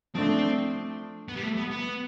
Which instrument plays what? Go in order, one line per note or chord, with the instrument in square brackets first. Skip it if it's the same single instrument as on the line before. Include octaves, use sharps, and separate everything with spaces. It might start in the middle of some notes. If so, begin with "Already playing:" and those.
[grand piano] F3 A3 D4 [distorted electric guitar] C4
[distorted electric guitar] B3
G3
A3
B3
B3